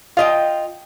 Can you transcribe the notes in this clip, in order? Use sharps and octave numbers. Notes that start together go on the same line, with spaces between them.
F4 D#5 F5 G5